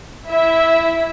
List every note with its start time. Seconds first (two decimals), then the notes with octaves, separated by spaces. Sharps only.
0.29 E4 E5